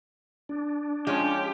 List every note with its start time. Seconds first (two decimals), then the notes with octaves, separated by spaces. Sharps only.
0.49 D4
1.07 F3 G#3 C#4 G4